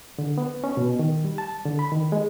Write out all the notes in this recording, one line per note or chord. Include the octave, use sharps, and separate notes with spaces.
D3
B3
C#4
B2
D#3
G3
A5
D3
B5
D#3
G#3